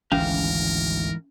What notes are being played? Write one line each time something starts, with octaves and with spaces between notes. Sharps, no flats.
G#1 D2 G#2 E3 C#4 A#4 F5